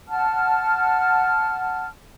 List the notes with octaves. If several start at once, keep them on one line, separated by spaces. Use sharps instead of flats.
F#5 A5 F6